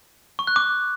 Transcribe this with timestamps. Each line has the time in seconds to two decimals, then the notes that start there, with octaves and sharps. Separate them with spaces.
0.39 C#6
0.47 F#6
0.56 D6